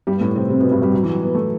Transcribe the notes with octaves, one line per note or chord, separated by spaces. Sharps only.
G2 G3
B3
A2 A3
C3 C4
C3 C4
B2 B3
G2 G3
G2 G3
F#3
E3
F#3
B3
A3